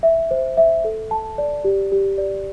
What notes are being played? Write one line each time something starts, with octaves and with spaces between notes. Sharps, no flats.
E5
C5
E5
A4
A5
D5
G4
G4
D5